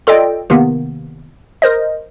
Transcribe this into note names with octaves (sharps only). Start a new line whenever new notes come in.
F4 A4 D5 D#5 G5
C3 D#3 A#3 B3
A#4 C5 D#5